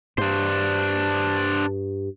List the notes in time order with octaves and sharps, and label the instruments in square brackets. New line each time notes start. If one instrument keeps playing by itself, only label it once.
[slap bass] G2 [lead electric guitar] D4 C5